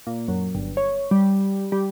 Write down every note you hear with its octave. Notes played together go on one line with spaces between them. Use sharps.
A#2
F#2
G1
C#5
G3
G3